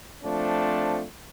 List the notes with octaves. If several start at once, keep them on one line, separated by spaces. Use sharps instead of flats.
F3 A3 C4 D4